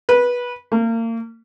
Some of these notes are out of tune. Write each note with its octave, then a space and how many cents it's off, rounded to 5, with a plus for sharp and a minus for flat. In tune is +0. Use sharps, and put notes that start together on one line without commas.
B4 -20
A#3 -35